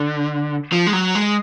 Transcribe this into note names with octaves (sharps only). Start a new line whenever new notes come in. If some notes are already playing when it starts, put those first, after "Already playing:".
Already playing: D3
F3
G#3
F#3
G#3